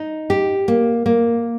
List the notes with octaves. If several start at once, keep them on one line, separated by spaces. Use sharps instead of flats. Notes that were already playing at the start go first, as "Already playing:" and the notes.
Already playing: D#4
G4
A#3
A#3